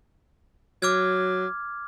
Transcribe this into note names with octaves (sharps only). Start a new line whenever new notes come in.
F#3 D6 F6 G#6